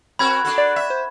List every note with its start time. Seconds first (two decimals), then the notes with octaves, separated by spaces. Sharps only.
0.19 C4 F#4 A#4 B5 G#6
0.44 D4 F#4 A4
0.58 D5
0.76 E5
0.90 C5